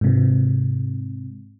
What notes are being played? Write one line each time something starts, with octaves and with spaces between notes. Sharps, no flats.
G#2 C3